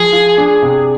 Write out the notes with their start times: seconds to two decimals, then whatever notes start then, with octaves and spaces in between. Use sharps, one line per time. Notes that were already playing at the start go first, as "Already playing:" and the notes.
Already playing: F3 G#4
0.13 F4
0.38 D4
0.62 C3